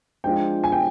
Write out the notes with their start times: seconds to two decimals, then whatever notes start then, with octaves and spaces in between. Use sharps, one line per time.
0.24 F3 G#3 D4 F4 G5
0.64 G#5
0.72 G5